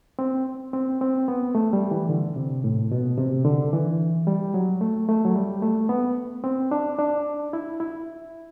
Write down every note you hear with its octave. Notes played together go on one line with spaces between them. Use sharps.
C4
C4
C4
B3
A3
G3
E3
D3
C3
A2
B2
C3
D3
E3
G3
F#3
A3
A3
F#3
G3
A3
B3
C4
D4
D4
E4
E4